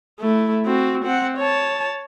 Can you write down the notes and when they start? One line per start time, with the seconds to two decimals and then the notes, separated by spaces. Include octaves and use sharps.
0.20 A3 E4
0.65 C4 F#4
1.04 C4 F#5
1.37 C#5 A5